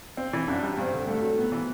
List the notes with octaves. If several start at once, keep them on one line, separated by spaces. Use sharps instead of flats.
C4
E3
F#2 D4
G3
G2 C4
D3
G2 A3
F#3
A2 B3
E3